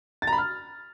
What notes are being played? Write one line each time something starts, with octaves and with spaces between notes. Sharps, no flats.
A6
A#5
B5
F6